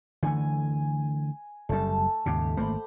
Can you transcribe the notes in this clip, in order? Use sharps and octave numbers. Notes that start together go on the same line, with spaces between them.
D3 E3 A3 G#5
F#1 F#2 G3 A3 A5
D#2 G#2 C#3 G4
G#1 A3 A#3 C5 B5